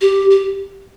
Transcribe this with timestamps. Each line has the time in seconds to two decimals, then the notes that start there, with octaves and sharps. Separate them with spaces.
0.01 G4
0.30 G4